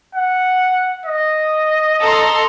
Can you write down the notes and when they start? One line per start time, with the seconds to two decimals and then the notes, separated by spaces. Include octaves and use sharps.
0.15 F#5
1.06 D#5
2.01 A4 A#5 C6